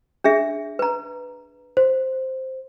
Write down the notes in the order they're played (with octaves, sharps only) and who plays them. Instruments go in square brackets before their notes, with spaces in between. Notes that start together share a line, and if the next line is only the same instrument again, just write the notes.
[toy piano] D4 G#4 E5
B4 A#5
[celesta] C5